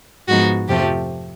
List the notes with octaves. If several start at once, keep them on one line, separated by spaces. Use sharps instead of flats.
G#2 F3 G#3 B3 D#4 F#4
F2 C3 F3 A3 G4